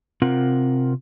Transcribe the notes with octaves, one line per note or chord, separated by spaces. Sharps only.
C3 C4 F4 A#4 F#5